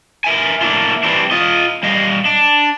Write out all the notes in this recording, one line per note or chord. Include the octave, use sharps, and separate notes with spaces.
A#4 E5 G#5
A3 A#3 D4 E4 F4
E3 G3 C4 D4
F4 D#5
G3 D#5 F5
D4